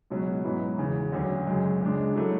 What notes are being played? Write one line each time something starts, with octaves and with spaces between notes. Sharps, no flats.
C#2 B2 F#3 C#4
G#2 F#3 B3 E4 B4
E2 C#3 E3
D2 D3 F#3 C#4
F#2 C#3 G#3
C#2 C#3 G#3 D4
F#3 A3 E4 A4